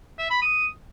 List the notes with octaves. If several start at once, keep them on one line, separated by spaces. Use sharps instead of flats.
E5
B5
D#6